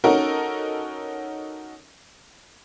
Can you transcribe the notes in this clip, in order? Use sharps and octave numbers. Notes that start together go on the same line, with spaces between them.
C#4 D#4 F#4 A4 A#4